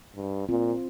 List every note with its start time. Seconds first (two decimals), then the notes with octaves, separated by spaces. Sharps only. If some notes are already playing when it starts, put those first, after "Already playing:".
0.16 G2
0.49 A#2 C4 F4